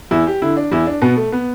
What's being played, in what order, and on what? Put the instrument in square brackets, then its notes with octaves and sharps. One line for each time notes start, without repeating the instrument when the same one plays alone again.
[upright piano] E2 E4
G4
D3 E4
D4
E2 E4
D4
B2 B3
A3
B3